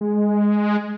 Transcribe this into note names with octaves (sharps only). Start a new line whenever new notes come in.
G#3